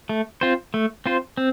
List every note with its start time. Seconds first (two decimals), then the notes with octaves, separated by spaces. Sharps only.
0.09 A3
0.41 C4 F4 C5
0.74 A3
1.06 C4 F4 C5
1.37 C4